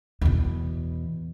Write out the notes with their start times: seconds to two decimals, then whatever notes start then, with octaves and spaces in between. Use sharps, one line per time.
0.21 E2 B2